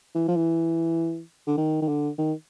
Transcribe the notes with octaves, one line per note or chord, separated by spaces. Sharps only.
E3
F3
E3
D3
D#3
D#3
D3
D#3